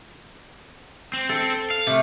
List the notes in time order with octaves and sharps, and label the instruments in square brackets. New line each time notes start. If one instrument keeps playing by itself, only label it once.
[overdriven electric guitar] C4
[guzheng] A4
[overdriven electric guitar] F5
[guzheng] C3 A3